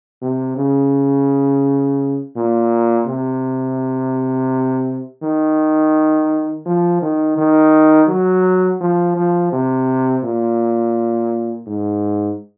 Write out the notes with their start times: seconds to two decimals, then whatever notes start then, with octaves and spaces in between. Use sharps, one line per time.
0.22 C3
0.57 C#3
2.36 A#2
3.07 C3
5.23 D#3
6.66 F3
7.02 D#3
7.38 D#3
8.08 F#3
8.81 F3
9.16 F3
9.52 C3
10.24 A#2
11.67 G#2